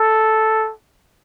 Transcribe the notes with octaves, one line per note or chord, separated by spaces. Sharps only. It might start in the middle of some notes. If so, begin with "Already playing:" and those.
Already playing: A4